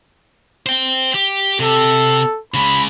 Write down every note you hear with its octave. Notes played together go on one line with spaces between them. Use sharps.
C5 G5
G4
C3 A4
C#3 G#3 B5